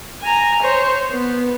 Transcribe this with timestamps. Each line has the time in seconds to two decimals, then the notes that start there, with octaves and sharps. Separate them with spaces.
0.22 G#5 A#5
0.62 C5 C#5
1.11 B3